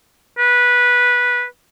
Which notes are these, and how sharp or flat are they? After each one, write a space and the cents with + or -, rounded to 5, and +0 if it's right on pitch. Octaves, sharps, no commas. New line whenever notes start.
B4 -15